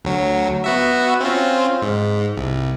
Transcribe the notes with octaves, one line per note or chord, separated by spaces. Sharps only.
D2 F#3
B3 F#4 E5
C4 C#4 F4
G#2
C2